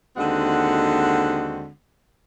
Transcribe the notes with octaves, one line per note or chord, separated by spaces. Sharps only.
D#2 D3 G#3 C4 F#4 F#5